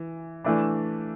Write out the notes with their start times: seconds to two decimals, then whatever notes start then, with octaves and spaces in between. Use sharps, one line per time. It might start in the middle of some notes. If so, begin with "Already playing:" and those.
Already playing: E3
0.44 E3 A3 D4